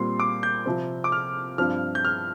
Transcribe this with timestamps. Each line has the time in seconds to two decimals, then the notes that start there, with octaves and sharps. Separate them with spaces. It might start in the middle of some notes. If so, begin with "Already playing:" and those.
Already playing: A#2 G3 C4 C6
0.20 D6
0.43 G6
0.66 C3 F3 C4
1.04 D6
1.12 F6
1.58 G2 F3 C4 F6
1.95 G6
2.05 F6